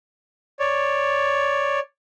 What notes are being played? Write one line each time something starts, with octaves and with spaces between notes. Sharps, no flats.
C#5 D5